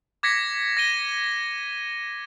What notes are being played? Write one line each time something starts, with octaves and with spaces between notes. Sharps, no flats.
D6 G#6 A#6 B6 C#7
A#6 B6 D#7 G7